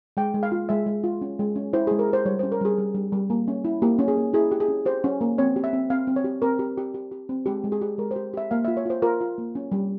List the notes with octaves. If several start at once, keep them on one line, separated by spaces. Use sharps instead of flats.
G#3 G5
G#3
F5
F4
G#3 E5
G#3
F4
C#4
G#3
C#4
E4 C5
G#4
G#3
A#4
G4 C5
G3 C#5
C#4 C5
A#4
G3 G#4
G3
G3
G3
A#3
C#4
E4
A#3 G4
C#4
G#4
A#3
E4 G#4
G4
G#4
C#4
G4 C5
C#4
A#3
C4 C#5
G4
E5
C4
C4 F5
C4
C#5
G4
C4 A#4
G4
G4
G4
G4
C4
G#3 G4
G#3
G#4
G4
G#3 A#4
C5
G4
G4 E5
A#3 F5
F4 E5
C#5
F4 C5
F4 A#4
F4
A#3
C#4
G3